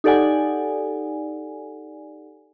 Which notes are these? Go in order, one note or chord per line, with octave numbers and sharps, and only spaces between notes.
D#4 G4 A4 D5 F#5 G#5